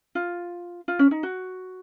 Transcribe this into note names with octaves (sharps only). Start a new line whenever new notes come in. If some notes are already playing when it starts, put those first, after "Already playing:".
F4
F4
C#4
D#4
F#4